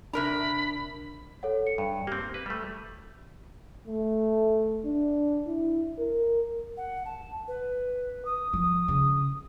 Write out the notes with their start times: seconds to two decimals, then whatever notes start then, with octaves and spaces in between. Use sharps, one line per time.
0.13 C3 D4 A#4 A#5 B5
1.43 A4 C#5 F#5
1.67 C#7
1.78 G2
2.07 A#3 C4 G4
2.34 B4
2.46 G3 A3
3.88 A3
4.86 D4
5.47 E4
5.99 A#4
6.77 F#5
7.05 A5
7.48 B4
8.25 D#6
8.53 F3
8.88 C#3